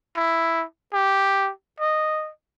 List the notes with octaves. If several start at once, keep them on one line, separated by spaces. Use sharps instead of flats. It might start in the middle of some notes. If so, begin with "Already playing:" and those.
E4
G4
D#5